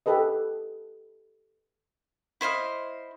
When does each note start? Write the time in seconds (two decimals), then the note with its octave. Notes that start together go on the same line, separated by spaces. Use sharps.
0.06 G4 A4 B4 D#5
2.41 E4 C5 D#5 F5